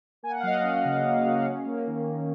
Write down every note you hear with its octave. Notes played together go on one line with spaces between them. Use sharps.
A#3 G#5
F#5
F5
F#3 D#5 F#5
C#4
C#3
A#3
F#3
C#4
A#3
D#3
D#3